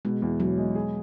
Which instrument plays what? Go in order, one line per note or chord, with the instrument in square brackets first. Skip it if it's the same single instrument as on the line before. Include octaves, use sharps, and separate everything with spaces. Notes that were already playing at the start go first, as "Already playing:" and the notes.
[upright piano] B2 [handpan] G#3
[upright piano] E2
[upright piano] B2 [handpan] F#3
[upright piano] G#3
G#4